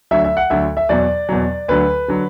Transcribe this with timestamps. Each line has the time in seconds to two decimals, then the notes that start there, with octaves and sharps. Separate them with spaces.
0.11 D2 D3 F#3 E5
0.24 E5
0.37 F#5
0.50 D2 D3 F#3 E5
0.77 E5
0.89 E2 B2 F#3 D5
1.29 E2 B2 F#3
1.68 D2 D3 F#3 B4
2.08 D3 F#3